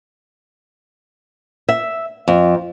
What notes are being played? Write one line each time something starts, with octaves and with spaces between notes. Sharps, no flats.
E5
F2